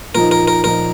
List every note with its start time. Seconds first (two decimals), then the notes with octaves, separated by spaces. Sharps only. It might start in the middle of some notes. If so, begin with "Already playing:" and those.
0.14 A#2 F3 D#4 A#4
0.31 A#4
0.48 A#4
0.64 A#2 F3 D#4 A#4